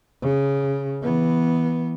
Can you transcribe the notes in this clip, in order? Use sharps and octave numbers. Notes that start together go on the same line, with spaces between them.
C#3
E3 B3